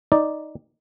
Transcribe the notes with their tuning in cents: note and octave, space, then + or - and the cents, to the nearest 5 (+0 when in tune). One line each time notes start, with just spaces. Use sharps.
D#4 +0 D5 +0